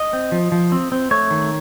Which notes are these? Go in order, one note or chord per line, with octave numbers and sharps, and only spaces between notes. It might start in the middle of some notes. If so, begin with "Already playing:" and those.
Already playing: D#5
C4
F3
F3
C4
C4
A3 C#5
D#3